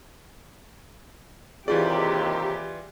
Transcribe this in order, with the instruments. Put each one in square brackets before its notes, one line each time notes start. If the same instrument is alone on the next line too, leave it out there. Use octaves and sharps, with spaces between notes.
[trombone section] D#2 C3 [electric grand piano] E3 F4 D5 [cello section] G4 [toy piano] G#4